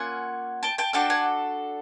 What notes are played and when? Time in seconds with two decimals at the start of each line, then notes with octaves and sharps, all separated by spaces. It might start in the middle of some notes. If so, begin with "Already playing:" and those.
Already playing: A#3 C#4 F4 F#5 G#5
0.63 G5 A5
0.78 G5 A5
0.93 D4 F#4 A4 G5 A5
1.10 F#5 G#5